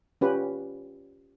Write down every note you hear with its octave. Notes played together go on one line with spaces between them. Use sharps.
C#4 F4 G4 B4